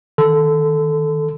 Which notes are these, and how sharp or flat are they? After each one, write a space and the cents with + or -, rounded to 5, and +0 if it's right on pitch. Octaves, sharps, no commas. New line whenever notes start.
D#3 +0 A4 -5 C6 -40